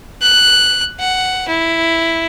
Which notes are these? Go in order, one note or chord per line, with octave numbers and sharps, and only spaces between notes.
F#6
F#5
E4